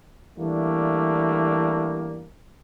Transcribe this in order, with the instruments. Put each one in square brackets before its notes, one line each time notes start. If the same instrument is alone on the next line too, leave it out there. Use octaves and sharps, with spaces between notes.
[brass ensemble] E3 G3 A3 A#3 D4